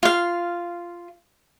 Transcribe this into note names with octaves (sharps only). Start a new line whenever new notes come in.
F4 F5